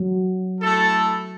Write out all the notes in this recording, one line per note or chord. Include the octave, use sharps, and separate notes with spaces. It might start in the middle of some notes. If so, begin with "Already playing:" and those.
Already playing: F#3
A3 E4 A4